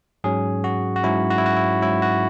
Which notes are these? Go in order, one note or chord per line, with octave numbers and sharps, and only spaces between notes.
G#2 F#3 C#4 G#4
F#4
F#4
G#2 F#3 C#4 E4
F#4
E4
F#4
E4
G#2 F#3 C#4 E4
F#4